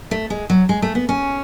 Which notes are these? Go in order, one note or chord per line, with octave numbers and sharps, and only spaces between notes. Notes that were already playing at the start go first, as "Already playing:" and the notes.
A3
G#3
F#3
G#3
A3
B3
C#4